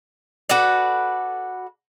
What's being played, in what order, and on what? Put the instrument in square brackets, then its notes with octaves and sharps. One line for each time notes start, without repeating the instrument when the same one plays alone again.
[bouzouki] F#4 A4 B4 D5